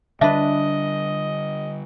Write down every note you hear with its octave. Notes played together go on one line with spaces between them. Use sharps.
D3 G3 D4 B4 D#5 E5